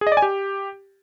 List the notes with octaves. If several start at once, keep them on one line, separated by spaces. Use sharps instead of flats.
G#4
D#5
D5
G#5
G4